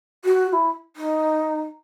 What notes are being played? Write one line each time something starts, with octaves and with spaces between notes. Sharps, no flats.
F#4
F#4
E4
D#4